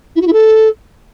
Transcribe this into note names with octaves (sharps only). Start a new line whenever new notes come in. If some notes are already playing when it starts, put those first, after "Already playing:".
E4
F#4
E4
A4